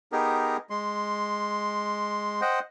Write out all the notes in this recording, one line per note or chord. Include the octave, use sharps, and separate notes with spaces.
B3 D#4 G4 G#4 A#4
G#3 C6
C5 D#5 F#5 G5